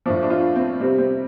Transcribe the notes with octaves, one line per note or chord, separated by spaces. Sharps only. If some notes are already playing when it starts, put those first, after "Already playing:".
A2 F3 D4
D4
F4
C4
C3 G3 C4
C4